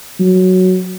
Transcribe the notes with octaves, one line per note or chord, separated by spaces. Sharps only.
F#3